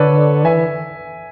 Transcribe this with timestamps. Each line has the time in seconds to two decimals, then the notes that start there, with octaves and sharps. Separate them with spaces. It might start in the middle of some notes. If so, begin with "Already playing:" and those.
Already playing: D3 A4 B4 C#5 D5
0.44 E3 E5 G#5